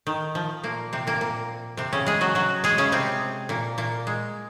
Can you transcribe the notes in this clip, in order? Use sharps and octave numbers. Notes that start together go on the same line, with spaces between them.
D#3
F3
A#2 A#3
C3 C4
A#2 A#3
A#2 A#3
C3 C4
C#3 C#4
G#3 G#4
F#3 F#4
F#3 F#4
G#3 G#4
C#3 C#4
C3 C4
A#2 A#3
A#2 A#3
G#3